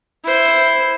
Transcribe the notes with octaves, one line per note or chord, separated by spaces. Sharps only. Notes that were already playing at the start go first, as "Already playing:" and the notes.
E4 C5